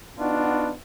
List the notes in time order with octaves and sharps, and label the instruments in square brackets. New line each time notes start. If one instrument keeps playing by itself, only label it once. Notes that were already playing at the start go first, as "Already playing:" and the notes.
[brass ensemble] B3 D4 D#4 F4 F#4